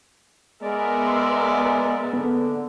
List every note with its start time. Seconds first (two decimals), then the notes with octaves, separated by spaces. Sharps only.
0.63 G#3 B3 A#4 D5 E5
1.07 C6 E6
2.13 D3 B3